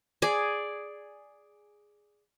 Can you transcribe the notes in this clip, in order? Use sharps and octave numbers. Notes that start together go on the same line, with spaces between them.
G#4 D5